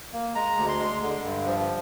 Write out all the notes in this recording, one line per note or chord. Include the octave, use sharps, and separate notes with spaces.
A#3
G#3 A#5
D2
C6
G#3
D3
G2
F3